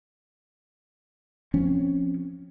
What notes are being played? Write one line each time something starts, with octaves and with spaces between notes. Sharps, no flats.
F3 C4 C#4